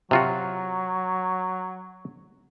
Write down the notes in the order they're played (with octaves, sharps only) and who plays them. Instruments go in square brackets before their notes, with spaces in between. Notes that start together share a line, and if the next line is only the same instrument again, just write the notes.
[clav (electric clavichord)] C3 F4 F#4 [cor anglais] F#3